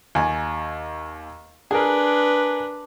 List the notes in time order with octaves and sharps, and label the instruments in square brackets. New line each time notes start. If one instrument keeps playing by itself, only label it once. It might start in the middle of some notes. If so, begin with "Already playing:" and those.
[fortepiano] D#2 G#5
[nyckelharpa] D4 B4 [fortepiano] G#4 A#4